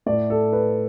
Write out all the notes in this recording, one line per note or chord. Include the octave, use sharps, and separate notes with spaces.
A2 A3 D5
A4
B4